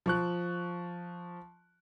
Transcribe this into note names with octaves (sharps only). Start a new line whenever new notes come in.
F3 C#6 F#6